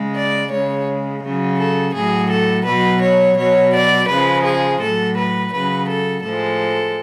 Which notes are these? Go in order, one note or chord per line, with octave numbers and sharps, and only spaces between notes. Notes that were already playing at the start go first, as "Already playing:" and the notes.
Already playing: C#3 G#3
D5
C#3 G#3 C#5
C#3 F#3
A4
A2 F#3 G#4
A4
B2 F#3 B4
C#5
B2 F#3 C#5
D5
C#3 F3 G#3 B4
G#4
A2 F#3 A4
B4
C#3 F#3 B4
A4
A2 F3 G#3 A4